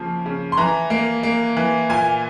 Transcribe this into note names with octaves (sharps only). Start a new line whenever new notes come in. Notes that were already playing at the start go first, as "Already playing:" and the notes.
Already playing: C#3 F3 A#3
C#3
C6
E3 A#5
A#3
A#3
E3
A#2 G#5